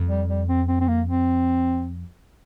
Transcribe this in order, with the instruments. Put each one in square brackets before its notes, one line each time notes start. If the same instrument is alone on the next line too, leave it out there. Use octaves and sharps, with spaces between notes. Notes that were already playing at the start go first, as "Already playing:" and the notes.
Already playing: [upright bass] F2
[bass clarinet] G3
G3
C4
C4
C4
A#3
C4